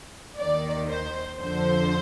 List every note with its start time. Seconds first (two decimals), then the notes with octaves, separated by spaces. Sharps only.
0.38 D#2 D#3 D5
0.89 C5
1.39 F2 D3 F3 C5